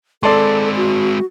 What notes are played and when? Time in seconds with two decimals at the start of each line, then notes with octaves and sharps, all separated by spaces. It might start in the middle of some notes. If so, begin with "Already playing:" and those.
0.23 G#3 C4 A4 D5 A5 C6
0.76 F#4